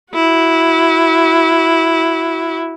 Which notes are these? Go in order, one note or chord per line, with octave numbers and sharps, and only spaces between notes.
E4 F#4